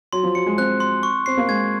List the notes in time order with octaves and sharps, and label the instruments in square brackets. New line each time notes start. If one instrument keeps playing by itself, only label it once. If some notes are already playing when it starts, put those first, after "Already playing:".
[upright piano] F#3 [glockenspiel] C6
[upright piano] F3
[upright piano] F#3 [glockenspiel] C#7
[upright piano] G#3
[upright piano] C4 [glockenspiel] F#6
[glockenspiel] C6
C#6
[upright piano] C4 [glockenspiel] C7
[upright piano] A#3
[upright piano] G#3 [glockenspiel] G#6